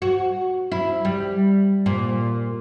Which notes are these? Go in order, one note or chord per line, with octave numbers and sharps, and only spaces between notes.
F#4
E4
G3
A#2